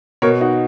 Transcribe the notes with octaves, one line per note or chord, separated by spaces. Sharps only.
B2 A#4 C#5
D#4 F#4